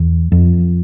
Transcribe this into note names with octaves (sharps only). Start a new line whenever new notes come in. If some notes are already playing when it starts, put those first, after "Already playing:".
Already playing: E2
F2